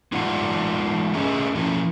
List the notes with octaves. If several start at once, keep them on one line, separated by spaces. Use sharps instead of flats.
G#3 D#4 F4 B4 D5 F#5
A3 C#4 G#4 D#5
F3 C#4 E4